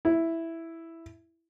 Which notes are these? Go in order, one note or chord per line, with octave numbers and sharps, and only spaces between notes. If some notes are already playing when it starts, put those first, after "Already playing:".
E4